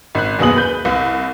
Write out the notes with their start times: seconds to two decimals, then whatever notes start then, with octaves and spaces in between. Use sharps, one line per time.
0.15 G#1 F#6
0.39 F#1 D#2 B2 G#4 D#6 F#7
0.56 B4 G6
0.85 C2